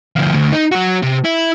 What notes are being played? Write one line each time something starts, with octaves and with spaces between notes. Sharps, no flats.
D2 F3
D2
D#4
F#3 F#4
C3
E4